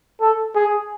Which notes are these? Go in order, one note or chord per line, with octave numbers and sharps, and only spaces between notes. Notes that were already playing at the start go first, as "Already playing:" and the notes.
A4
G#4